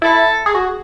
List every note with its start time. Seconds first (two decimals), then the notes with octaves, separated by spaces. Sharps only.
0.02 E4 A4
0.46 G#4
0.55 F#4